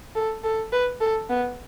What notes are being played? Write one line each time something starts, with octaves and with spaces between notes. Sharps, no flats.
A4
A4
B4
A4
B3